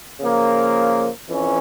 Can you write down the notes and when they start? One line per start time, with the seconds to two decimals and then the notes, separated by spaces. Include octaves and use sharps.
0.20 C#3 F3 A#3
1.30 F2 E3 C#4